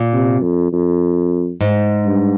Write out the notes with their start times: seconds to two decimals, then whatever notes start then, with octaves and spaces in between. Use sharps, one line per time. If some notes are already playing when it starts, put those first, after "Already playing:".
Already playing: A#2
0.13 C3
0.42 F2
0.72 F2
1.61 G#2
2.05 G2